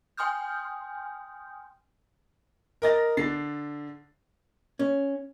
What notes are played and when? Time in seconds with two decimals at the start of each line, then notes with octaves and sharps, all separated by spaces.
0.17 G5 G#5 C6 D#6 F6 G6
2.82 A#4 D#5 A6 A#6
3.17 D3 A6 C7
4.79 C#4